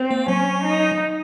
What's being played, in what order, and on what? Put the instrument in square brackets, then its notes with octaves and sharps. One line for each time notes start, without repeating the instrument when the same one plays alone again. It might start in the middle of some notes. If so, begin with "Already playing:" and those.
Already playing: [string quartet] C4
[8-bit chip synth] A#3
[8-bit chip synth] F#3 [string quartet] C#4
[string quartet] D#4